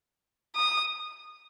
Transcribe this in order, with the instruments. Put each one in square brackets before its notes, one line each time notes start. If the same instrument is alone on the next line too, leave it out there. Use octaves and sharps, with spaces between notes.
[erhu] D#6